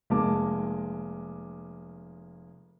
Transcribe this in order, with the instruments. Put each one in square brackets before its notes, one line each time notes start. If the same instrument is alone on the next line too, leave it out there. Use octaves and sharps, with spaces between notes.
[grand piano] F1 G#3 A#3 A5 D6